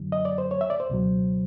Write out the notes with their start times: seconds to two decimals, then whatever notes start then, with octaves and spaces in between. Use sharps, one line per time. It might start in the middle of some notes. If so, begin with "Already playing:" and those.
Already playing: F#2 D3 F#3
0.12 D#5
0.25 D5
0.38 C5
0.51 C#5
0.61 E5
0.70 D5
0.80 C5
0.90 C#2 B2 F#3